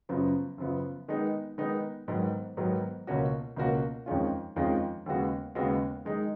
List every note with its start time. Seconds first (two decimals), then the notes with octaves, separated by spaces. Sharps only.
0.09 F#2 C#3 F3 B3
0.58 F#2 C#3 F3 B3
1.08 D#3 G#3 B3 D#4
1.58 D#3 G#3 B3 D#4
2.08 G#2 D#3 F#3 B3
2.57 G#2 D#3 F#3 B3
3.07 C#2 B2 A#3 C#4 F#4
3.56 C#2 B2 A#3 C#4 F#4
4.06 F2 D#3 G#3 C#4 F4
4.56 F2 D#3 G#3 C#4 F4
5.06 D#2 C#3 G#3 B3 F#4
5.55 D#2 C#3 G#3 B3 F#4
6.05 D#3 G#3 D#4